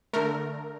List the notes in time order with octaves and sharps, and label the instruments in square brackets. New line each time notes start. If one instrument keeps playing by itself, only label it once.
[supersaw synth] D3 A3 A#4